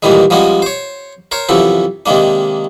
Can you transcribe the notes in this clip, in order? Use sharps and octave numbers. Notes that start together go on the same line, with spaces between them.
G2 A#2 D#3 E3 G3 G#3
F3 G3 G#3 C#4 F#4
C5 C#5
A#4 C5 C#5
F#2 C3 E3 F3 A4
C3 D#3 G#3 A#3 D4